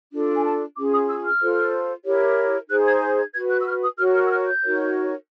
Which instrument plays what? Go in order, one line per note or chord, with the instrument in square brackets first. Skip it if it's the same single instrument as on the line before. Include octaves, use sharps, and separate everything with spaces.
[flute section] D4 F4 A4
G#5
A5
C#4 F4 G#4 D6
D#6
E6
F6
F4 A4 C5
E4 G4 A#4 C#5
D#4 G#4 C5 F#6
G#6
G6
G#6
F#4 B4 G#6
F#6
E6
F6
D#6
F#4 A#4 C#5 F6
F6
E6
F6
G6
D#4 F#4 A#4 C#5